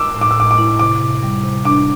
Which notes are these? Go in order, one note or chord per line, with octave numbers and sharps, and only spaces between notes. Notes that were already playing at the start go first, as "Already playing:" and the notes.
Already playing: D6 E6
A2
D6
E6
A2 D6
D6
E4
C3 D6
C3
G3
C3
D4 D6